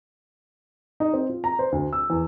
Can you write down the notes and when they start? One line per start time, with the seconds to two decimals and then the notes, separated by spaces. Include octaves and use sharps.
1.00 D#4
1.14 C4
1.30 F4
1.44 A#5
1.59 C5
1.72 D2
1.93 E6
2.10 E2